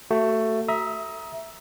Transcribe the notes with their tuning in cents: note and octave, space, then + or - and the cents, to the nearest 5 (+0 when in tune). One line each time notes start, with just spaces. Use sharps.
A3 +15 F#4 +25
E5 +0 A#5 +15 D#6 +25